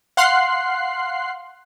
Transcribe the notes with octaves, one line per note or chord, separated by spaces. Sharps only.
F5 F#5 C6 F#6 C7